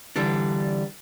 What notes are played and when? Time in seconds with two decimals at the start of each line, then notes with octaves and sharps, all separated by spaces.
0.16 D3 E3 G3 D4